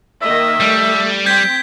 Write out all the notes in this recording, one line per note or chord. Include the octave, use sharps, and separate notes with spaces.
D#3 A#3 D#5 E5
G3 A3
C4 G5 G6 G#6 B6